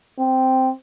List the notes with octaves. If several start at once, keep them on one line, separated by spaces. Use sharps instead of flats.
C4